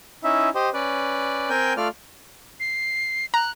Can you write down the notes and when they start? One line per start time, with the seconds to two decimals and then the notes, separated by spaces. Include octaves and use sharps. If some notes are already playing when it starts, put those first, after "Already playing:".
0.24 C#4 D#4 E4 E5
0.55 G4 C5 D#5
0.74 C#4 B4 D5
1.50 C4 A#4 G5 G#5 G6
1.77 A3 F4 D5 F6
2.60 C7
3.34 A#5 F#6